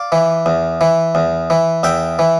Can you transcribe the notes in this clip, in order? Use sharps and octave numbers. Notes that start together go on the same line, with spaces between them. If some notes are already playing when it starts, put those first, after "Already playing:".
Already playing: D5 F5
E3
E2
E3
E2
E3
E2 E5 G5
E3